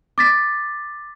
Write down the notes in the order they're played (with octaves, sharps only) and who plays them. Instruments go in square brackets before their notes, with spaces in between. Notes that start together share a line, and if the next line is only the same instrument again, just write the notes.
[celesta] D6 A6 B6